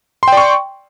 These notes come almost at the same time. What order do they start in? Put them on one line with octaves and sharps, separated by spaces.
C6 G5 D5 C#6